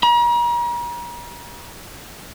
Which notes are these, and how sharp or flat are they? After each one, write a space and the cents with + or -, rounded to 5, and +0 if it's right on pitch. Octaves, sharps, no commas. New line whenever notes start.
A#5 +40